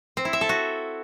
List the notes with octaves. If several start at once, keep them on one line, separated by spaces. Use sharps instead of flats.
C4
E4
E5
A4
F#4